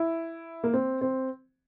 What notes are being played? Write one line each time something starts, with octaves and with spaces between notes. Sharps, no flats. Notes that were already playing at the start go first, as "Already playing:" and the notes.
Already playing: E4
A#3
C4
C4